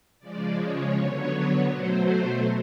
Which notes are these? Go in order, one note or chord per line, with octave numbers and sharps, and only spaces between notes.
C#3 F3 G#3 D5
C#5
D3 F#3 B3 C#5
B2 F#3 A3 C5